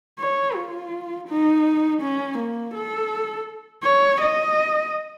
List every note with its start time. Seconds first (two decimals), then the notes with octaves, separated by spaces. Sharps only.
0.20 C#5
0.55 F4
1.28 D#4
2.01 C#4
2.39 A#3
2.74 A4
3.84 C#5
4.21 D#5